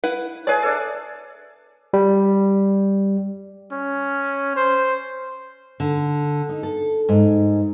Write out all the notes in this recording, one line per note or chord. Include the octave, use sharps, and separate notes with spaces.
E4 B4 F#5
G#4 B4 C#5 D5 E5 A5
D4 A4
G3
C#4
C5
D3
D#4
A4
G#2